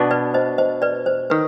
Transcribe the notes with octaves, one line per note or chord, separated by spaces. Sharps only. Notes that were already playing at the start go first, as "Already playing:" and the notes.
Already playing: B2 B3 D4
B4 D5
C5 D#5
C5 D#5
B4 D5
C5
D#3 B4